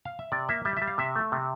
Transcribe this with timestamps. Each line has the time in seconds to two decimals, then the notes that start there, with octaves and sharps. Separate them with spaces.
0.05 F5
0.19 E5
0.32 C3 D5
0.49 A#3 E5
0.65 G3 E5
0.77 E5
0.82 G3
0.87 F5
0.98 C3 E5
1.16 A3
1.32 C3